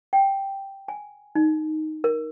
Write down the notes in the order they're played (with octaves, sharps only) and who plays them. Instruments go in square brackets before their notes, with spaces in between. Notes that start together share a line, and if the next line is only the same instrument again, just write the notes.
[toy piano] G5
G#5
D#4
A#4